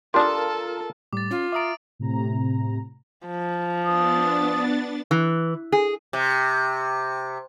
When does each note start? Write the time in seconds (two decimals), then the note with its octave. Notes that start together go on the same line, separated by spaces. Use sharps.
0.14 D4 F4 G4 A4 A#4 A5 C6 D#6
1.13 A2 G3 D6 A6
1.31 C#4 F4 D6
1.52 E5 A#5 D6 D#6 D7
1.99 A2 C3 A#5
3.27 F3
3.84 B3 D4 D#6 A6
5.11 E3
5.72 G#4
6.13 C3